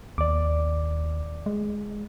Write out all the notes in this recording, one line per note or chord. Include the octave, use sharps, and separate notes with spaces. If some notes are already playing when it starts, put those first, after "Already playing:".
D#2 D5 D6
G#3